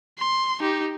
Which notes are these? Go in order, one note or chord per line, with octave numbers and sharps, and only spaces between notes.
C6
D#4 G4